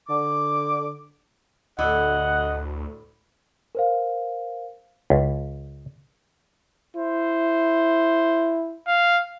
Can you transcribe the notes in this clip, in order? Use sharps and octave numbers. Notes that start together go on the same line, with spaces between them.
D3 D6
D2 A2 E4 D5 D#5 F#5
A#4 C5 F5
C#2
E4 C5
F5